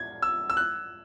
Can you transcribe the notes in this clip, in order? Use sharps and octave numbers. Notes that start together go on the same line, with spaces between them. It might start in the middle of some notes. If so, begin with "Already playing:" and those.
Already playing: G#6
E6
E6
F#6